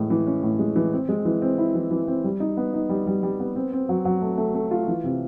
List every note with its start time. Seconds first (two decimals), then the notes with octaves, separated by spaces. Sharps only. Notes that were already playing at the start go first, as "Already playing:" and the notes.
Already playing: A2 E3 G#3
0.10 E3
0.27 C#4
0.43 A2
0.59 G#3
0.76 E3
0.92 C4
1.09 G#3
1.25 E3
1.41 C4
1.58 E4
1.75 E3
1.91 E3
2.08 C4
2.24 G3
2.40 D#4
2.57 B3
2.74 D#4
2.89 G3
3.07 G3
3.23 G3
3.40 B3
3.55 C4
3.73 C4
3.89 F#3
4.05 F#3
4.22 A3
4.37 A3
4.54 A3
4.71 F4
4.88 E3
5.04 C3